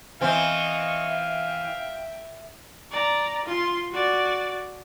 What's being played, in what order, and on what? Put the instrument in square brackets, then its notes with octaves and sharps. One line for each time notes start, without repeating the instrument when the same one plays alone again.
[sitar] E3 C4 [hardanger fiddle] D#5 C#6 [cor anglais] F5
[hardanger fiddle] E5 G5
[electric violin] D5 A#5
F4 C6
F#4 D5